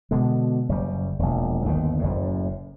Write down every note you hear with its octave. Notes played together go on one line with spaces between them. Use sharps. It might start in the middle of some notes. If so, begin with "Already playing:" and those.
B2 D3 G#3
F#1 C#3 G3
E1 A#1
G1 D#2 D3 D#3
F#1 F#2 A2